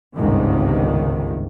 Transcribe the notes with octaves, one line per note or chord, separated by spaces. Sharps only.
G1 C#2 G#2 C3 D#3